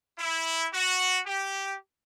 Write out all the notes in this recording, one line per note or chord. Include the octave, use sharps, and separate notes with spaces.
E4
F#4
G4